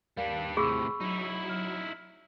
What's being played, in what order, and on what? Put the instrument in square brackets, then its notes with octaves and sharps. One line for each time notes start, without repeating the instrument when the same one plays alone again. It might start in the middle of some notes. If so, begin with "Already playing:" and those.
[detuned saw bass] D#2 [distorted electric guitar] G3 D4 [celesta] A#4 F5
[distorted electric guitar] A2 C3 [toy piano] G#4 [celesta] B5 C#6 E6
[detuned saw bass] F#3 [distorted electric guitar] D#4 E4
[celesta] F6